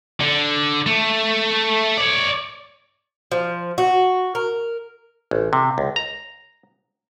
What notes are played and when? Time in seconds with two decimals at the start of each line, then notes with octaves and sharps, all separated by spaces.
0.21 D3
0.86 A3
1.98 C#5 D5
3.32 F3
3.78 F#4
4.35 A#4
5.31 A1
5.53 C3
5.78 C#2
5.96 A#5